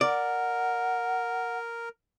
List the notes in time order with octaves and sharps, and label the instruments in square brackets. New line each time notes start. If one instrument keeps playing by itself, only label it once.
[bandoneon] A#4 [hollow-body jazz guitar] D5 [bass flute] F#5